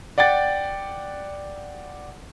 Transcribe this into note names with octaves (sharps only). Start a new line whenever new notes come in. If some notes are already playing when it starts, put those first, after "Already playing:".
D5 F#5 G5 A6